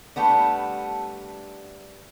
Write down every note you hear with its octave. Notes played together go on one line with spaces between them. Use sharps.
G3 A3 B3 D4